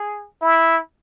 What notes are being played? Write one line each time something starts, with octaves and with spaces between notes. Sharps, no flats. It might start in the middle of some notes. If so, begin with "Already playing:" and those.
Already playing: G#4
E4